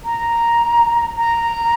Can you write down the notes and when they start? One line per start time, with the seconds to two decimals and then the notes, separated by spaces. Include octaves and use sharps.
0.05 A#5
1.17 A#5